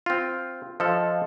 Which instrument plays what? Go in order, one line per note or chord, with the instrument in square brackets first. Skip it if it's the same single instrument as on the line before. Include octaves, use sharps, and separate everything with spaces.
[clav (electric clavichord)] C4 F4
[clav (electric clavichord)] F3 A4 [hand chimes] D#5 F5 C6